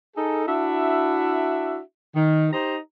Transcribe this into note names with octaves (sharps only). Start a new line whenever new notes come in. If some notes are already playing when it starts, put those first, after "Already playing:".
D#4 G#4 A4
D4 E4 F#4 E5
D#3
D#4 G4 C5 A#5